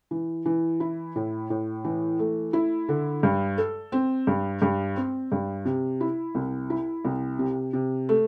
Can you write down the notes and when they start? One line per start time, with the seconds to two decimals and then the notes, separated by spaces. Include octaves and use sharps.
0.11 E3
0.45 E3
0.80 E4
1.16 A2
1.50 A2
1.84 E3
2.19 A3
2.53 E4
2.89 D3
3.23 G2
3.58 A4
3.92 C4
4.27 G2
4.62 G2
4.96 C4
5.32 G2
5.65 C3
6.01 E4
6.35 C2
6.70 E4
7.05 C2
7.39 C3
7.73 C3
8.09 A3